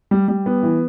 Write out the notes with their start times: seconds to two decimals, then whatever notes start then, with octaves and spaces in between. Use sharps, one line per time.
0.11 G3
0.28 G3
0.46 B3
0.63 E3